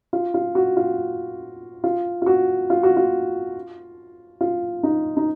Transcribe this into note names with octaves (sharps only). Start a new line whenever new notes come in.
F4
F4
F#4
F4
F4
F4
F#4
F4
F#4
F4
F4
D#4
D#4